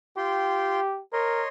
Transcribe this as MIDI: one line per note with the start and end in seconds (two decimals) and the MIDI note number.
0.17 0.80 65
0.17 1.02 67
0.17 0.80 79
0.17 0.80 84
1.13 1.44 70
1.13 1.48 73
1.13 1.48 75
1.13 1.48 84